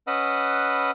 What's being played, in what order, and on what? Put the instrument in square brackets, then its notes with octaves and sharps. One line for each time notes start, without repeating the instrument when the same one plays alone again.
[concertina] C#4 B4 D#5 F#5 B5 E6